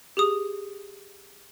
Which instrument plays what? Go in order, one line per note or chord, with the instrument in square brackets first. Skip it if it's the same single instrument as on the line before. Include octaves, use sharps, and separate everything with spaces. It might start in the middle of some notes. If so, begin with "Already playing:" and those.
[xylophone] G4 G#4 D#6